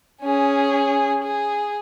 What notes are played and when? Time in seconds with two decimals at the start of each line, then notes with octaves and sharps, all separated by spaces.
0.22 C#4 G#4
1.24 G#4